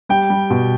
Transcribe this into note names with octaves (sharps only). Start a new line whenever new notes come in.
G3 G5
G3
B2